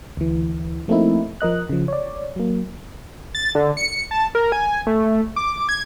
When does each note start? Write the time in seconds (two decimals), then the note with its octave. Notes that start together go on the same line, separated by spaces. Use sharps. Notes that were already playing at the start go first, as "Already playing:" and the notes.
0.17 D2 E3
0.88 F3 A3 A#3 C4 D#4 E4
1.41 F3 A#4 D#5 F#6
1.69 C#3 F3
1.88 C#5 D5
2.36 F#3 A#3
3.35 A6
3.55 D3
3.77 C#7
4.11 A5
4.35 A#4
4.52 G#5
4.87 A3
5.36 D6
5.69 G#6